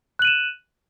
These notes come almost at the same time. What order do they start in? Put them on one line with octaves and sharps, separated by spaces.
F#6 F#7 D#7 E7